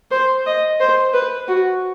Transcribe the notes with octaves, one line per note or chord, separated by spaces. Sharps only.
C5
D#5
C5
B4
F#4